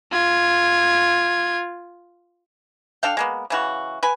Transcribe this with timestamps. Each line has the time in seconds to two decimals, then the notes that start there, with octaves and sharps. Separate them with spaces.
0.12 F4 G#6
3.03 D4 A4 F5 G5
3.17 G#3 A#3 B3
3.50 C#3 E3 F#4
4.03 B4 G#5